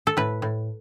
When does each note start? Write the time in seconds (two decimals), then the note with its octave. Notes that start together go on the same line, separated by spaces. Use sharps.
0.07 A4
0.17 A2 B4
0.42 A2